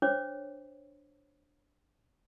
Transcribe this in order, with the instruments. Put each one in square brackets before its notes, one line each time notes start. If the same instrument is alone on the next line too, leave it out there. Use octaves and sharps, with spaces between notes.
[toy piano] D4 C5 C#5 D6